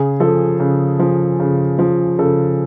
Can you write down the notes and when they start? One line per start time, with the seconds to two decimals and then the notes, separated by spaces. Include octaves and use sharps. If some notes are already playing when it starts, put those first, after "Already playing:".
Already playing: C#3 G#4
0.20 F3 A4
0.60 C#3
1.00 F3
1.40 C#3
1.79 F3
2.19 C#3 A4